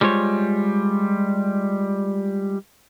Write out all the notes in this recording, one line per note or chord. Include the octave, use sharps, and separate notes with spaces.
G3 G#3 F4 C5 C#5